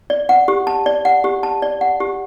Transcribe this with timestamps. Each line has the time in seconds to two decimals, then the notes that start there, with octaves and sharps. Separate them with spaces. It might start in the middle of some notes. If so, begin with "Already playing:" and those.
0.10 D5
0.29 F#5
0.48 G4
0.67 A5
0.86 D5
1.05 F#5
1.24 G4
1.43 A5
1.62 D5
1.81 F#5
2.00 G4